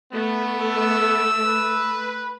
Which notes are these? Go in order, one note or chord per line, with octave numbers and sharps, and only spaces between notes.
A3 B3
E6
B4